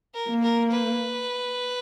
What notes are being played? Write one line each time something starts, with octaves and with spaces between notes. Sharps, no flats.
A#4
A#3
A#4
B4